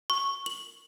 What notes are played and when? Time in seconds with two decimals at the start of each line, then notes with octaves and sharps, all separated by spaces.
0.10 C#6
0.46 F#7